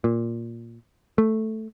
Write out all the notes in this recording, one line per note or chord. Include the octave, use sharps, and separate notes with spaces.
A#2
A3